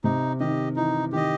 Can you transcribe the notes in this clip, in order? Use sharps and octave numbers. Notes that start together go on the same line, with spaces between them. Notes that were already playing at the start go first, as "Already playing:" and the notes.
C3 D#4
D#3 G4 D#5
E3 D#4
D#3 G4 D#5